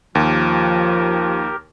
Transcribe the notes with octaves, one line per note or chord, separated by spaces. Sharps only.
D#2 F3 G4 A#4